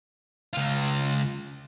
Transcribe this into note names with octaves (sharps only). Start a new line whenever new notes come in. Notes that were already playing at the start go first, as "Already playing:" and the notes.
C#2 F4